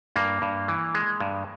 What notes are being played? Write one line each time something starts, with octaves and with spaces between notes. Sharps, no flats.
G2 A#3
G2
E3
G#3
G2